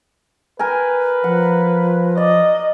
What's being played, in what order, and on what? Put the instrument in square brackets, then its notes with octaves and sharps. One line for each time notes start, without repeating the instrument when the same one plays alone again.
[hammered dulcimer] A#4 G5 G#5 [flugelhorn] B4
[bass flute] F3 [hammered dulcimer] F#5
[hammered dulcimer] D5 [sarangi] D#5